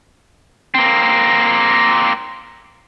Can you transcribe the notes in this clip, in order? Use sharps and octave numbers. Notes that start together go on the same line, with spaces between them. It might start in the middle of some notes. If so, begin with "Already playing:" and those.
A#3 C4